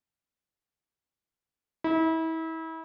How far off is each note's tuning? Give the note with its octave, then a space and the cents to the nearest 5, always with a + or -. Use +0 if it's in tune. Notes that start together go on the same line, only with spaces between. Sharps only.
E4 -35